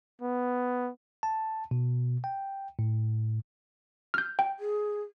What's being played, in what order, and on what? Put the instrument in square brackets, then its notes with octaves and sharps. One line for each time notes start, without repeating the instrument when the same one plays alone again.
[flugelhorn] B3
[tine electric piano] A5
B2
G5
A2
[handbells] F6 G6
G5
[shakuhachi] G#4